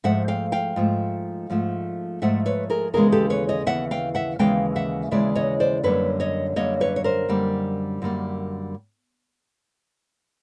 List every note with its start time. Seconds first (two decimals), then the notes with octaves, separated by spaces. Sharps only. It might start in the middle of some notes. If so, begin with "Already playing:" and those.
0.04 G#2 F3 A3 E5 F#5
0.28 F5 G5
0.52 F5 G5
0.76 G#2 F3 A3
1.50 G#2 F3 A3
2.22 G#2 F3 A3 E5 F#5
2.46 B4 C#5
2.70 G#4 A#4
2.94 D#2 C#3 E3 G#3 B3 G#4 A#4
3.12 G4 A4
3.30 B4 C#5
3.49 C#5 D#5
3.67 D#2 C#3 E3 B3 E5 F#5
3.91 F5 G5
4.15 E5 F#5
4.39 D#2 C#3 E3 G#3 B3 F5 G5
4.76 E5 F#5
5.11 D#2 C#3 E3 G#3 B3 D5 E5
5.35 C#5 D#5
5.60 C5 D5
5.84 F#2 D3 G3 A#3 B4 C#5
6.20 C#5 D#5
6.56 F#2 D3 G3 A#3 C#5 D#5
6.81 B4 C#5
6.96 C#5
7.04 A#4 C5
7.29 F#2 D3 G3 A#3
8.02 F#2 D3 G3 A#3